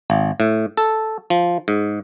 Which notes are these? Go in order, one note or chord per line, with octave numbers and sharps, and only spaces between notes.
G#1
A2
A4
F3
G#2